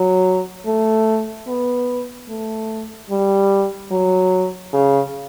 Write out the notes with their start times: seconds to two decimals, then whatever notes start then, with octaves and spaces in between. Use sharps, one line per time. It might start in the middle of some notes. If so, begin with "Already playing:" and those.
Already playing: F#3
0.66 A3
1.47 B3
2.29 A3
3.10 G3
3.91 F#3
4.73 C#3